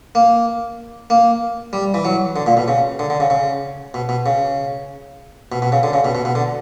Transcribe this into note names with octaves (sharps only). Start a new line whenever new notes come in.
A#3
A#3
G3
E3
F#3
D3
A#2
B2
C#3
D3
D3
C#3
C#3
B2
B2
C#3
B2
B2
C#3
D3
C#3
B2
B2
B2
D3